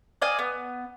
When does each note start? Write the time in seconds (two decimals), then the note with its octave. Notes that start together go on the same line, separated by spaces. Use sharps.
0.22 D5 D#5 F5 G#5
0.39 B3